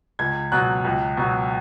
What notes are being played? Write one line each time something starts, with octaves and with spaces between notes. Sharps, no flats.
C#2 G#6
B2 F#3 F#6
C#2
B2 F#3